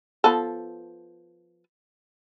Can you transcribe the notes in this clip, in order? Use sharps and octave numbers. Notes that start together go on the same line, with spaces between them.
F3 B3 A4